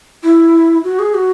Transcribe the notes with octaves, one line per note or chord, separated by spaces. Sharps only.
E4
F#4
G#4
F#4